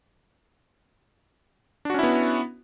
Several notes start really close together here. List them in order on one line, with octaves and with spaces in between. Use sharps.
D4 F#4 C#4 E4 B3